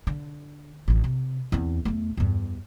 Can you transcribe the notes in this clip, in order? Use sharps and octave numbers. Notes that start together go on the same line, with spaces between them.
D3
A1 D#3
C3
E2 C4
E2 A3
E2 G2